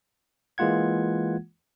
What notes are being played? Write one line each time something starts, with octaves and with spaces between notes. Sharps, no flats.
E3 G#3 A#3 F4 F#5 G#6